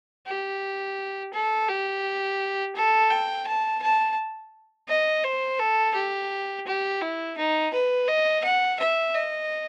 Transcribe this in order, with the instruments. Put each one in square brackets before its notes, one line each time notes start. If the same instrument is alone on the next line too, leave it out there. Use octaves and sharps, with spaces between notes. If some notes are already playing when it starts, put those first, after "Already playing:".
[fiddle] G4
A4
G4
A4
G5
A5
A5
D#5
C5
A4
G4
G4
E4
D#4
B4
D#5
F#5
E5
D#5